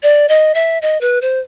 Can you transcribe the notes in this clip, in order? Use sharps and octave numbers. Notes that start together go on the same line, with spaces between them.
D5
D#5
E5
D#5
B4
C5